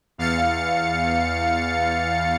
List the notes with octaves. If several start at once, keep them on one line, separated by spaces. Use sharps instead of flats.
E2 F5 A6 C#7